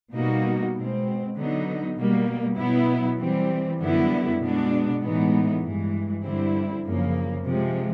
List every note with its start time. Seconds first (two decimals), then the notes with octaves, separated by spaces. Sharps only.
0.14 B2 G3 A#3 D#4 F#4
0.74 B2 G#3 C4
1.35 D3 F#3 B3 D#4
1.96 B2 G3 A#3
2.57 B2 F#3 B3 E4
3.19 E3 G3 C4
3.80 F#2 D3 G3 B3 E4
4.41 B2 G#3 B3 D4
5.01 A2 E3 G#3 B3 D#4
5.63 G2 E3 G#3
6.24 G2 D3 G3 C4 E4
6.85 F#2 C#3 F3 A#3
7.46 C3 F3 G#3